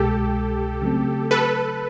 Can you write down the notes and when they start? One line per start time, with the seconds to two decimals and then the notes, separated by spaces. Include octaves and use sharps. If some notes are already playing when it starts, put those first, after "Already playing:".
Already playing: C2 B2 G#3 G4 A4
0.82 C#3 F#3 A3 C4
1.31 A4 B4